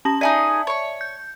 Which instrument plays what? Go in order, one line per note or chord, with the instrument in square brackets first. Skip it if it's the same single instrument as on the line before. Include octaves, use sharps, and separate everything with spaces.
[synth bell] C#4 A5 A#6
[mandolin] D#4 G#4 G#5 [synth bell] D5 E5 A5
[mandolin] C#5 C#6
[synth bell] G6